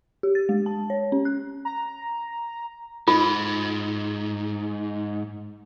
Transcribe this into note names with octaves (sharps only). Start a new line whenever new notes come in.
G4
A6
G#3
A5
C#5
C#4
F#6
A#5
G#2 F4